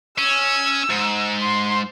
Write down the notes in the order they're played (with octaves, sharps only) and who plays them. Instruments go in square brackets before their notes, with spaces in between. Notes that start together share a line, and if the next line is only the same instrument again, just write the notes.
[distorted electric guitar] C#4 [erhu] E6
[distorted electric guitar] G#2
[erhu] C6